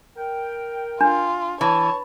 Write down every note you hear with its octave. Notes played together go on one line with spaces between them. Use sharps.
A#4 G5
D4 F4
E3 C#5 A5